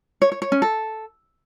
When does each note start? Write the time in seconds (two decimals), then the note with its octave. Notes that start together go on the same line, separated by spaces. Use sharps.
0.22 C#5
0.32 C#5
0.42 C#5
0.52 C#4
0.62 A4